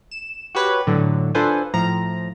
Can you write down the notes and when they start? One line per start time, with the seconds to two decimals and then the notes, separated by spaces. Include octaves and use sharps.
0.11 E7
0.55 F#4 G4 B4 C#5
0.87 A2 D3 F#3
1.35 D4 F4 A4 B4 C5 G#5
1.74 A2 F3 A#5